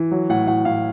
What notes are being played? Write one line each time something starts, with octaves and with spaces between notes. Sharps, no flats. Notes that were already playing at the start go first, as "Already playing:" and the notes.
Already playing: E3
F#3
A2 F#5
A2 F#5
A2 F5